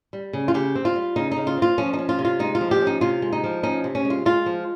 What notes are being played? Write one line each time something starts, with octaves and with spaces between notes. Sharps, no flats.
G3
C#3
F4
C#3 G4
C4
F4
G3
C#3 D#4
D#4
C#3
F4
C4 F4
F3 C#4
D#4
C#4
F4
C3
F4
G#3 D#4
F4
F3
G4
C#4
D#4
C3 F4
G#3
D#4
F3
C#4 D#4
C3
C#4
G#3
F4
G#3 F4
F3